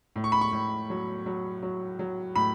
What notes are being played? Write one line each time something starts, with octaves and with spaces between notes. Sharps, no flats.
A2
C#6
B5
C#6
A2
F#3
F#3
F#3
F#3
A2 B5